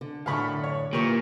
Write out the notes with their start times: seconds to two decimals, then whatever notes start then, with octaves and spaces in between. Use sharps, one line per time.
0.01 D3
0.26 F#2 A2 D3 F5 B5 C#6
0.64 C#5
0.93 A#2 E3 G4 A#4 C#6